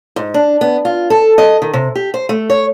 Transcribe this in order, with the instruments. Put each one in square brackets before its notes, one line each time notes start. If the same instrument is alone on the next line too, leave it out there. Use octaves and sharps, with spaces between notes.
[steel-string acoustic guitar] G#2
D4
B3
F4
A4
D#5
D#3
C3
G4
C5
A3
C#5